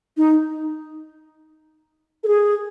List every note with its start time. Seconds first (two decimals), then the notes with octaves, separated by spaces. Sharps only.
0.17 D#4
2.24 A4
2.28 G#4